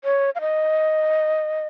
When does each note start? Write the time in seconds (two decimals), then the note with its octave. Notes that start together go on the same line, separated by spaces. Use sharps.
0.04 C#5
0.35 F5
0.41 D#5